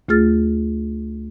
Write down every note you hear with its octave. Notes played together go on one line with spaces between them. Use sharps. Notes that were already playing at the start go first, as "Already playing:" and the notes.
D2 A3 F4 G#4 F6 A6